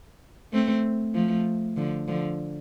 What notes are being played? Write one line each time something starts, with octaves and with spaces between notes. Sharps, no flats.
A3 C4
F3 A3
D3 F3
D3 F3